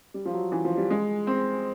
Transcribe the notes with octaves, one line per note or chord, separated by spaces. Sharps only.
G3
F3
F#3
E3
F3
G3
G#3
C4